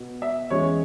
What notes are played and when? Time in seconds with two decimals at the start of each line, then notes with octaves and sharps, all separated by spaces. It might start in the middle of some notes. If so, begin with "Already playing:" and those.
Already playing: B2 B3
0.22 E5
0.50 E2 E3 G#3 C#4 C#5